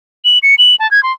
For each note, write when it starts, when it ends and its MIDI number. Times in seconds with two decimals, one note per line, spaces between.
0.25 0.38 102
0.43 0.55 97
0.58 0.75 102
0.79 0.89 81
0.91 1.03 92
1.03 1.12 84